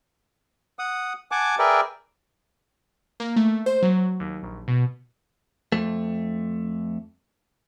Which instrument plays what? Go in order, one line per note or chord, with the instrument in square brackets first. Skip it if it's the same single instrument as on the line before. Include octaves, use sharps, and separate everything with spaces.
[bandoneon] F#5 D#6
F#5 G#5 A5 D6
G#4 A#4 B4 D5 E5 G5
[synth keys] A#3
A3
C5
F#3
D#2
A#1
B2
[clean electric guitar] F2 A3